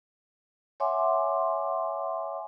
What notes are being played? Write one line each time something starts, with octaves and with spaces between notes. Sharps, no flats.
C#5 E5 F#5 G#5 C6 D6